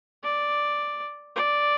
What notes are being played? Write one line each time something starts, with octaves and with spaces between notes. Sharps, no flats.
D5
D5